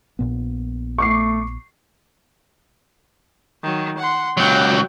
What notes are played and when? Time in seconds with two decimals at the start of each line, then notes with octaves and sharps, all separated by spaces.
0.19 A#1 A#2 B3
0.98 A3 C#6 D6 C7
3.63 D#3 F#3
3.98 F#5 C6
4.37 C#2 F#3 G5